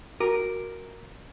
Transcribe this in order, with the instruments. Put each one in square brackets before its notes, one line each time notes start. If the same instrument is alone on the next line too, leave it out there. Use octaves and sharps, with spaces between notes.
[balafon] F#4 [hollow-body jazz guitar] A#4